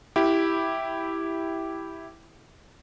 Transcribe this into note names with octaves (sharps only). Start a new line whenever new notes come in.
E4 G4